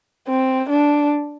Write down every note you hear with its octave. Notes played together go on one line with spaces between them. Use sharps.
C4
D4